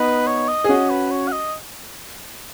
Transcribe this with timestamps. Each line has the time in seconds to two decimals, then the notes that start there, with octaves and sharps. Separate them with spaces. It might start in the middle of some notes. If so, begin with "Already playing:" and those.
Already playing: B3 D#4 B4
0.27 C#5
0.48 D#5
0.64 G#4
0.69 C#4 F#4 D#5
0.90 B4
1.11 C#5
1.28 F#5
1.32 D#5